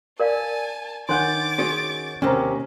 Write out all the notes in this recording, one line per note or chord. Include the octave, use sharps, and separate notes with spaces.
A#4 D5 F5 G#5 A5
D#3 D4 C#5 F#5 C6 D6 G6 A6
C#4 F#4 G#4 C#5
D#2 C3 C#4 A#4 A#5